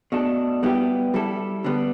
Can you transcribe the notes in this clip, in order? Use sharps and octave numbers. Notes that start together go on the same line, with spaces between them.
B2 A3 D4 A4
G3 B3 E4 G4
G3 E4 A4
D3 G3 B3